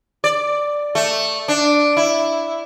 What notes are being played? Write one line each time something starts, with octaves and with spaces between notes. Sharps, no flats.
D5
A3
D4
E4